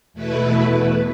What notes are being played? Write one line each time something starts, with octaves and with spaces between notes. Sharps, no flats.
E2 B2 A3 E4 B4